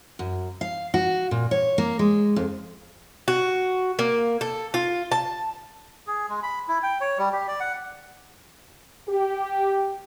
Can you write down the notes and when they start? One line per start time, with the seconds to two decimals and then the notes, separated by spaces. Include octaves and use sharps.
0.19 F#2
0.61 F5
0.94 F#4
1.31 A#2
1.51 C#5
1.78 A#3
1.99 G#3
2.36 F2
3.28 F#4
3.99 A#3
4.41 A4
4.74 F4
5.12 A5
6.07 G#4
6.29 G#3
6.43 B5
6.68 E4
6.83 G5
7.01 C#5
7.18 G3
7.33 G4
7.48 D5
7.60 F#5
9.08 G4